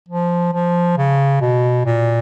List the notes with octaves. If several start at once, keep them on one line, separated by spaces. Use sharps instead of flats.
F3
F3
C#3
B2
A#2